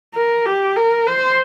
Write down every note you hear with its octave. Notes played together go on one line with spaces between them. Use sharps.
A#4
G4
A#4
C5